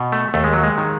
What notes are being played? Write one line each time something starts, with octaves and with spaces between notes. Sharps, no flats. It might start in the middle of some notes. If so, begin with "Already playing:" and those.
Already playing: B2
A3
D#2 A3
G#3
F#3
G#3
D#3